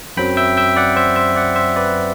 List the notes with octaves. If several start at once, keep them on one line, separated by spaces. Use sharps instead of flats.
F#2 F#3 C4 G5 B5
E5 G5
E5 G5
D5 F#5
C5 E5
C5 E5
D5 F#5
C5 E5
B4 D5